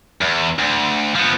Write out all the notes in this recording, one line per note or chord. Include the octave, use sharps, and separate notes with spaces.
E2
D2
F3 B3